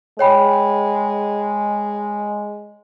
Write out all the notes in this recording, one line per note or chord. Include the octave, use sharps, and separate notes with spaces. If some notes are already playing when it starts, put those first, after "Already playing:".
G#3 C#5 G5 B5